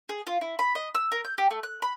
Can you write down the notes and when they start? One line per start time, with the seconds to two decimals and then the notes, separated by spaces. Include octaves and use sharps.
0.09 G#4
0.27 F4
0.41 E4
0.59 B5
0.75 D#5
0.95 E6
1.12 A#4
1.25 G6
1.38 G4
1.51 A3
1.63 F#6
1.82 B5